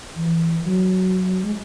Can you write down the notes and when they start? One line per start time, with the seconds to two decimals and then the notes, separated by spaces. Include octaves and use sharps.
0.15 E3
0.64 F#3
1.43 G#3